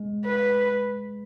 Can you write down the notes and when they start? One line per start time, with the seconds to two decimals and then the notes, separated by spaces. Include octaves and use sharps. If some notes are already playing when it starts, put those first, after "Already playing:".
Already playing: G#3
0.25 B4